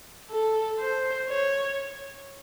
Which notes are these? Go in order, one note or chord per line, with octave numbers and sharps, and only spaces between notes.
A4
C5
C#5